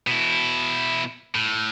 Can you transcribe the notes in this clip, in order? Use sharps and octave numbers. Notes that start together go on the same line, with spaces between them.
B2 E4
A2